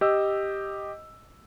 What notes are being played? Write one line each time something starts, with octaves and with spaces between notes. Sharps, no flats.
G4 D#5 E6